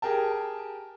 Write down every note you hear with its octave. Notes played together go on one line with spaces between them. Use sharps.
G4 G#4 A#4 G5 A5